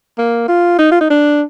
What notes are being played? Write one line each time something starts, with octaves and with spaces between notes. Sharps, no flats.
A#3
F4
D#4
F4
D#4
D4